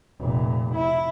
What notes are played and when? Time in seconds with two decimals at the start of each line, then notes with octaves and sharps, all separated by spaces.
0.20 F1 A#2
0.75 E4